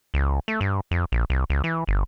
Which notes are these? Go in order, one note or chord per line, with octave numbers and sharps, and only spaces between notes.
C#2
A3
G2
F2
A#1
C2
C#2
E3
G1